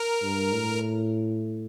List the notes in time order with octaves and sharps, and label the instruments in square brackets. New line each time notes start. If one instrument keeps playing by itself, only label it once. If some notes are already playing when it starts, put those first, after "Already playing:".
Already playing: [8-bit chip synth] A#4
[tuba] G2
A2